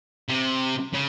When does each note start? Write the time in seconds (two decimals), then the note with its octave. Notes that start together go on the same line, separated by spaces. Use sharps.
0.29 C3
0.93 C#3